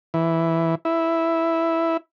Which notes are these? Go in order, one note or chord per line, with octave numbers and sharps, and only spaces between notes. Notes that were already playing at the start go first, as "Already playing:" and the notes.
E3
E4